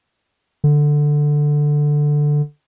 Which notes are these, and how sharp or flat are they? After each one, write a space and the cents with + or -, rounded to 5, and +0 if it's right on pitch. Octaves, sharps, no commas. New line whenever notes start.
D3 +5